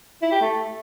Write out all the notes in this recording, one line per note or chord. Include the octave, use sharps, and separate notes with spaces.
E4
G4
A3